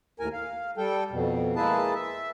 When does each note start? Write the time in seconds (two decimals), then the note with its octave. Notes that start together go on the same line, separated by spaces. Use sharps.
0.20 D#2 A2 A#4 G#5
0.33 F5
0.77 G3 A4 G5
1.11 F2 B2
1.56 G#3 A#3 E4 G#4 B4 A5
1.95 E5